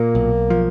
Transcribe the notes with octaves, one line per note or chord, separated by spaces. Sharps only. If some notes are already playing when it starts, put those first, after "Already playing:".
Already playing: A#2 A#3
B1
F3